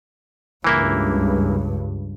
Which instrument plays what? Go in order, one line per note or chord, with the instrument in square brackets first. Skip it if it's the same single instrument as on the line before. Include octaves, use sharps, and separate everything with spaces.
[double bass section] C#2 G2 [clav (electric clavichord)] E3 A#3 E4